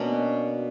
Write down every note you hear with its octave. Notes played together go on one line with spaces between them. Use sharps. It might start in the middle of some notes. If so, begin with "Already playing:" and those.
Already playing: B2 A#3 C#4 D4 F#4